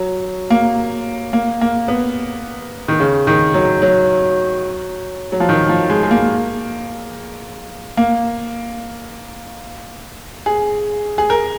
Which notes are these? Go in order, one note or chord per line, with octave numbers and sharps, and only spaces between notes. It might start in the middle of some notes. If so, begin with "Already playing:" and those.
Already playing: F#3
A#3
A#3
A#3
B3
D#3
C#3
D#3
F#3
F#3
F#3
F3
D#3
F3
G#3
G#3
A#3
A#3
G#4
G#4
A#4